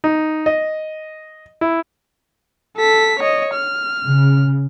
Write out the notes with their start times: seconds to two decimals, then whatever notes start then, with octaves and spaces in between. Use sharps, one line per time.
0.04 D#4
0.46 D#5
1.61 E4
2.77 A4 B6
3.20 C#5 D#5
3.54 F6
4.04 C#3